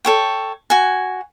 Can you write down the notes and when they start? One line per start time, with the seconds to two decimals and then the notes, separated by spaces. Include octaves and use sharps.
0.05 A4 C#5 G5
0.70 F#4 G#5